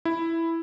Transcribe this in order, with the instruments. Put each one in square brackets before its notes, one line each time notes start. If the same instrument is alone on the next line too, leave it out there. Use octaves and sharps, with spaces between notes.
[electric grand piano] E4